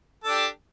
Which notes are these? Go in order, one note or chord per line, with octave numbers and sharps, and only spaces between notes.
D4 G4 A4